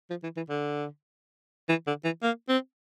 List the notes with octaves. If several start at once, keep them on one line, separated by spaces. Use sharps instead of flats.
F3
E3
E3
D3
E3
D3
E3
A#3
C4